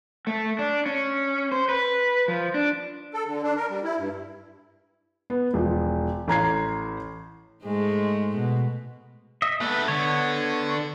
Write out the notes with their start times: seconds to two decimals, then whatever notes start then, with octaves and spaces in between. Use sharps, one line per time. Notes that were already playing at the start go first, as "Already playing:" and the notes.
0.27 A3
0.59 D4
0.86 C#4
1.52 C5
1.69 B4
2.28 F3
2.54 D4
3.14 A4
3.27 D3
3.43 D4
3.57 A#4
3.70 G3
3.84 E4
3.99 G2
5.30 B3
5.54 E1 F3
6.28 A1 A#5 G#6 C7
7.64 G#2 G#3 A3
8.36 B2
9.42 D#5 E5
9.61 A3 B3 B4 E5
9.88 D3 B3 C#5